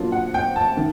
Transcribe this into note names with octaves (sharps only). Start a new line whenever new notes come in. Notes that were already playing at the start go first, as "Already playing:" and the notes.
Already playing: B2 F#3 A#3 D4 F4
F#5
G5
A5
D#3